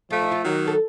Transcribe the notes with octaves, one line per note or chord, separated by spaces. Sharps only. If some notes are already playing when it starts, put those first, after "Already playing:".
F3 A3 F4
D#4
F4
D#3 F#3
A4